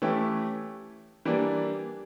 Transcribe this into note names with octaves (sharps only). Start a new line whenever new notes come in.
E3 A3 C#4 E4 G4
E3 G3 A#3 D4